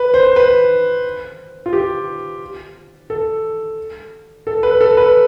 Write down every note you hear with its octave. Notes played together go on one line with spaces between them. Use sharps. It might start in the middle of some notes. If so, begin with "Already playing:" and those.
Already playing: B4
C5
B4
F4
G4
A4
A4
B4
A4
B4